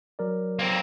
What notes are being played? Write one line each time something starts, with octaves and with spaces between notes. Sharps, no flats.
F#3 A#4 D5
A#3 C4